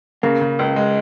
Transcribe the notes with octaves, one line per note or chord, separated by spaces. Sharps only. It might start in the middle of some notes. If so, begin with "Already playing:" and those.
C#3 A#3
C#3
C#2
G#3